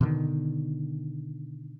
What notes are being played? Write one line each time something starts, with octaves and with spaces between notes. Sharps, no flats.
B2 D3 D#3